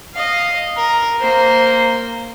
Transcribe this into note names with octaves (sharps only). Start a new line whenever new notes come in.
D#5 F5
A#4
A#3 C5